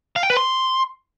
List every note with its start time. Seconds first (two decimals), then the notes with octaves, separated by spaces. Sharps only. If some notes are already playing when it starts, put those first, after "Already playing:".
0.16 F5
0.23 G5
0.30 B4
0.37 C6